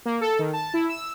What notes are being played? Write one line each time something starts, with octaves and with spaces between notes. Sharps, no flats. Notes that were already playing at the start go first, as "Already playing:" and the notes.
A#3
A4
D#3
A5
E4
E6